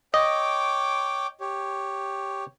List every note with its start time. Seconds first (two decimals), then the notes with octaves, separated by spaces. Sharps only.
0.14 C#5 D#5 G5 D6
1.41 G4 C#5